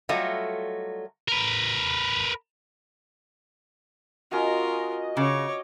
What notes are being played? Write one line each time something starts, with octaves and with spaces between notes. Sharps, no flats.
F#3 G3 A3 F4 A4 D#5
A#4 B4
C#4 F4 F#4 A#4 D#5
C#3 C#5 D6